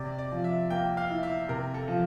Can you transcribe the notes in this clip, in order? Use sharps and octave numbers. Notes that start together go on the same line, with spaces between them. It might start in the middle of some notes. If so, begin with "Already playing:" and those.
Already playing: C3 D5
D5
F3
E5
A#3 G5
F5
E4
E5
C3 A#4
A4
F3